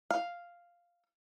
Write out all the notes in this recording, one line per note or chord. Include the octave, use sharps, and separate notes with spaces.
F5